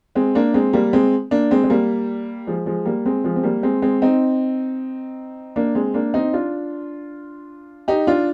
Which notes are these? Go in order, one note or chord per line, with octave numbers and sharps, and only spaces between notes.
G#3 C4
A#3 D4
G#3 C4
G3 A#3
G#3 C4
A#3 D4
G#3 C4
G#3
G3 A#3
F3 G#3
F3 G#3
G3 A#3
G#3 C4
F3 G#3
C4
G3 A#3
G#3 C4
G#3 C4
C4 D#4
A#3 D4
G#3 C4
A#3 D4
C4 D#4
D4 F4
D#4 G4
D4 F4